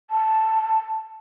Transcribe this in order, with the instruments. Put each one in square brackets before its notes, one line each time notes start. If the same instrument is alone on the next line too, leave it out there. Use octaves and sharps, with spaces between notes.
[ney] A5